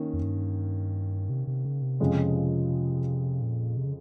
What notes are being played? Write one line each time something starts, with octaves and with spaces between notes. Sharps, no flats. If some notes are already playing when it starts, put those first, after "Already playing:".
Already playing: D#3 A#3 C#4
F2
G2
C3
C3
C#3
C3
F2 C#3 F3 G#3
A#2
C3
C#3